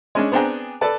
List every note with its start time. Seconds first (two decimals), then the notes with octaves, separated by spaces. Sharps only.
0.15 G#3 C#4 D4
0.32 B3 C4 D4 G#4 G5 A#5
0.81 A4 B4 D5 A5